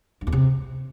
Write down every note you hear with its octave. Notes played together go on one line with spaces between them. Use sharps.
G2
E2
C3